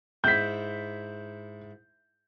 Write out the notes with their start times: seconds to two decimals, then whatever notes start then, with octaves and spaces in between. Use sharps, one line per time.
0.24 G#2 E4 G6 B6